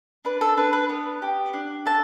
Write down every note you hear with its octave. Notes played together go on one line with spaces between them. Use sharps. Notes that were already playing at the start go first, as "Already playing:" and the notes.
D4 B4
A4
D4 B4
B4
B3
G4
D4
A4 A5